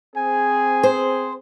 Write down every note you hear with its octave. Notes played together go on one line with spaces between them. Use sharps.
C4 G#4 G#5
C5